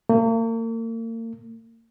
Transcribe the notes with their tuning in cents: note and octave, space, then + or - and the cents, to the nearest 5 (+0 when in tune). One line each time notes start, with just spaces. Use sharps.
A#3 -40